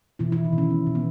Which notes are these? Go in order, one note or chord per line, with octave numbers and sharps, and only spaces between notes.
B2 E3 E4
E3 E4
B2
D#3 D#4
B2
C#4
B2 B3
B2
B3